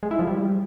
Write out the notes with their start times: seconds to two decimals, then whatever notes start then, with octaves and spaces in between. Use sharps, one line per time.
0.03 G#3
0.11 E4
0.19 F3
0.27 G3